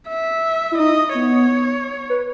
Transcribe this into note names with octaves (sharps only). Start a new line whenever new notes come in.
E5
E4
D#4 D#5
B3 C#5
B4